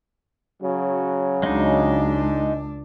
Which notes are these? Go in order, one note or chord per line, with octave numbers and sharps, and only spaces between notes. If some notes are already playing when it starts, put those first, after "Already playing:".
C#3 F#3
C#2 G#3 D4 D#4